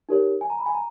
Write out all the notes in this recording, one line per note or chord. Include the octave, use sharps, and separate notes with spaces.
D#4 G4 A#4 C#5
G#5
A#5
B5
G#5
A#5